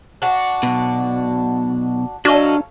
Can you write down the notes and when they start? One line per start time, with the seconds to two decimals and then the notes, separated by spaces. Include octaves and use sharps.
0.22 D4 F#4
0.63 B1 B2
2.25 F#3 D4 F#4 A4 D#5 F5